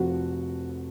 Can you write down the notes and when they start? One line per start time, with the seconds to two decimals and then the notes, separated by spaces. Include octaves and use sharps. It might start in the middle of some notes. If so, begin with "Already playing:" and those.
Already playing: F1 F2 F3 F#4